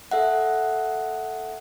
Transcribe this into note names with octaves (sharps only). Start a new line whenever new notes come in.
A4 E5 F#5